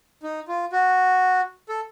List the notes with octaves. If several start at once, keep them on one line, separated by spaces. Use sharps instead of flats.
D#4
F4
F#4
A4